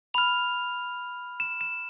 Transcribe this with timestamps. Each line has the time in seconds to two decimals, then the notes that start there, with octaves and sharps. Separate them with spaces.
0.14 B5 F6 F7
1.40 E7
1.61 E7